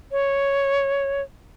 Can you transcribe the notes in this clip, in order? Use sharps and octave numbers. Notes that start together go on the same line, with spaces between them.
C#5